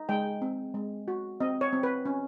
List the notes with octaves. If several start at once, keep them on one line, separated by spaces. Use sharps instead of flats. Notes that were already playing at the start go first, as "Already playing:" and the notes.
Already playing: D#4
G#3 G5
C4
G#3
F#4
C4 D#5
C#5
C4
B4
C#4